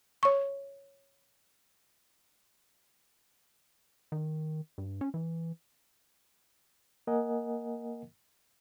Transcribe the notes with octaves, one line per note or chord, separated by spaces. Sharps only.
C#5 C#6
D#3
G2
C#4
E3
A#3 A#4 D#5 F#5 G#5